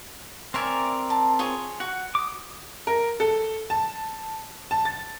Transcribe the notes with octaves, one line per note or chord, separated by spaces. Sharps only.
C4 A#4 C#5 D5 E5 G#5
A5
F4 G#4 C#5
F#4 F#5
D6 D#6
A#4
A4
A5
A5
A6